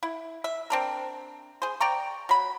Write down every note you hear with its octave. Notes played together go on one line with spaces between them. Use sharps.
E4
E5
C4 D4 A#4
G#4 C5
D5 G5 A#5 C#6
F#3 B5